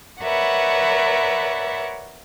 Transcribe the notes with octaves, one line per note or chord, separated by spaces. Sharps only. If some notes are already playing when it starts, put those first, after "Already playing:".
A#4 B4 C#5 D5 E5 F#5